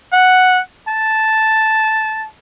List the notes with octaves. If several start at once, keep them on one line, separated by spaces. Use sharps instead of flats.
F#5
A5